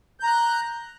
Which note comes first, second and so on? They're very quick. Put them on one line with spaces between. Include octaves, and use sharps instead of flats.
G6 A#5 F#6